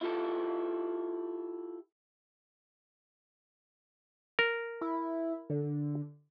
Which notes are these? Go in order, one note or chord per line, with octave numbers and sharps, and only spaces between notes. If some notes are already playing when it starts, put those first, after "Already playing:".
E4 F4 G4 A4
A#4
E4
D3